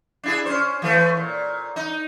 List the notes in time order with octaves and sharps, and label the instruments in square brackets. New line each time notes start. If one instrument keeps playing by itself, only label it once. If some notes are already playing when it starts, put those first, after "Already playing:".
[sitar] D4 E4 G#4
C#4 C5
E3 A3
A#2
D#4